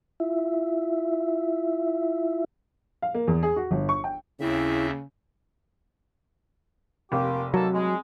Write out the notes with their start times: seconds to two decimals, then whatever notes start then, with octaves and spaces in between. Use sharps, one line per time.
0.20 E4 F4 E5
3.02 F5
3.14 A#3
3.28 E2
3.43 G#4
3.56 F#4
3.71 G1
3.89 C#6
4.04 G5
4.40 D#2 C#3 C4 E4 E5
7.12 F1 A#3 F4 G4
7.54 D#3 F#3 A#3 A4
7.74 G#3